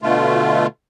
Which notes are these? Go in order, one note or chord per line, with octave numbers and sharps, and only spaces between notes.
B2 D3 A3 F4